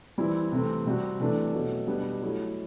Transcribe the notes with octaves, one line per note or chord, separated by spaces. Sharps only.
E3 G3 C4 E4
C3 E3 A3 C4
C3 G3 C4 F#4
C3 E3 A3 D4
B2 F#3 A3
B2 G3 B3 D4 G4
F#3 A3 E4